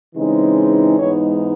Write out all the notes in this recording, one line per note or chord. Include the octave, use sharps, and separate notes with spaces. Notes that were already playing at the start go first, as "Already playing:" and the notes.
C#3 E3 G#3 C4 D#4
G#2 E3 G#3 B3 D#4 C#5